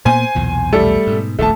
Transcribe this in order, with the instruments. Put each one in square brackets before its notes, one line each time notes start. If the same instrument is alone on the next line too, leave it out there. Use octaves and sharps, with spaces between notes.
[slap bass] A#2 A#3 B3 [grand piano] C5 G#5
[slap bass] B1 E2 A#2
[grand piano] G3 A3 A4
[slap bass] G#2 B2
[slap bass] D#1 A#1 F2 [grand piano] A3 A5